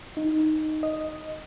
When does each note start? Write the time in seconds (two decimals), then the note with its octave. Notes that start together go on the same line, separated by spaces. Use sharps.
0.17 D#4
0.83 D#5